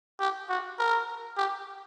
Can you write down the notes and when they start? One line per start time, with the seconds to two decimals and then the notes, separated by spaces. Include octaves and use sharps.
0.20 G4
0.49 F#4
0.79 A#4
1.37 G4